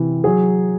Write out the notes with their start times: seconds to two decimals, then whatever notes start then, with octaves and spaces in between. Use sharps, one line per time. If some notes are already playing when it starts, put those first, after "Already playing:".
Already playing: C3 E3
0.24 F#3 G#4